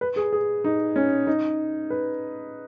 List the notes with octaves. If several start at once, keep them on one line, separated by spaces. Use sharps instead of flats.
B4
G#4
G#4
D#4
C#4
D#4
B4